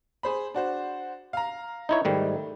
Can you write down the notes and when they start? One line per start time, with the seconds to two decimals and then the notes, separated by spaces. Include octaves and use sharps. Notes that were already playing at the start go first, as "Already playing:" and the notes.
0.23 G#4 C5 B5
0.54 D4 F#4 C5
1.33 F5 A#5
1.89 D#4 E4 C#5
2.05 G#2 D#3 G3 A3